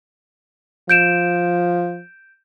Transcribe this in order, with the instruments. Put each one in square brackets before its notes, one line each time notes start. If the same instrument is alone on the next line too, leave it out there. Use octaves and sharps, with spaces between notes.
[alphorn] F3 [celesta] G6 D7 E7